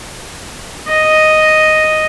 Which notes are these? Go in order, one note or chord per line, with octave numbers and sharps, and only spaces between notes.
D#5